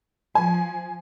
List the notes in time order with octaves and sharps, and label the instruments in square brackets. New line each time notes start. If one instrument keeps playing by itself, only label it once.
[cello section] F3 [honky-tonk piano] G#5